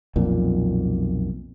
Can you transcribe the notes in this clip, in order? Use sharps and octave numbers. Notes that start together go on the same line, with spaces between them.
B1 F2 A#2